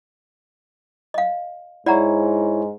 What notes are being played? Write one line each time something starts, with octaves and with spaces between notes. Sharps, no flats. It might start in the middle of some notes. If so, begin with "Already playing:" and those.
D#5 F5
G#2 E4 C#5 D5 F#5 A#5